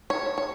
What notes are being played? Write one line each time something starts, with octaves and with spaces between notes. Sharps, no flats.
C#5
C#5